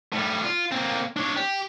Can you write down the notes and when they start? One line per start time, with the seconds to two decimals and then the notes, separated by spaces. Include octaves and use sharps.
0.12 A2 G3
0.43 F4
0.72 A#3 C4
1.17 D4 C#5
1.36 G4